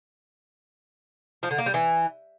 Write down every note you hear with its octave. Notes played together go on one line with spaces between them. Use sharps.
F3
D3
A#3
G3
E3